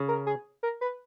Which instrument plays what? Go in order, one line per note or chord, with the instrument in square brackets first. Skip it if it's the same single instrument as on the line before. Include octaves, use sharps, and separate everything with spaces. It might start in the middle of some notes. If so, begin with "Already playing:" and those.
Already playing: [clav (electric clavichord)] C#3
[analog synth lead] A#4
G#4
A#4
B4